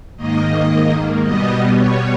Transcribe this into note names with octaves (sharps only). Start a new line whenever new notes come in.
G#2 D#3 A#3 D#5
B2 G3 B3 D#5
C#5